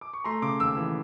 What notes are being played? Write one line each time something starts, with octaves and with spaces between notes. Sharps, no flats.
D6
C#6
A3 A#5 C6
C#3 C6 D6
D#2 D6 E6
E3